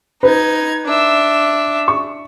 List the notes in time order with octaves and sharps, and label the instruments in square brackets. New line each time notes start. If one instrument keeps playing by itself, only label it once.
[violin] D#4 G#6 [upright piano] B4
[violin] D4 E5
[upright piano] C#6